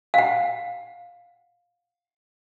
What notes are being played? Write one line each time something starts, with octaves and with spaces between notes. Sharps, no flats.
F5 F#5